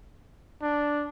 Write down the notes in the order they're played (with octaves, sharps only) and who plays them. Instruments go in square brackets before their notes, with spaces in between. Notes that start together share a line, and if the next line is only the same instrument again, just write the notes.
[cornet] D4